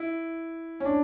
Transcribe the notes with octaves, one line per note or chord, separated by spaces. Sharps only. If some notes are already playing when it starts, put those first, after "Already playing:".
Already playing: E4
C#4
D4